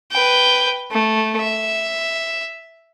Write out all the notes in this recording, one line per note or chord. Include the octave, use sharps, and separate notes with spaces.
B4 G5
A3
E5